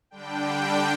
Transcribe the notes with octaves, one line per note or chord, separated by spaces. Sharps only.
D3 G3 D4 G5